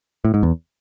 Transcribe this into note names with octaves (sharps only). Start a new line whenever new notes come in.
A2
G#2
E2